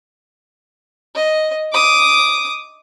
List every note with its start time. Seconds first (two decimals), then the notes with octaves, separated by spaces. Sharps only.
1.16 D#5
1.73 D6 D#6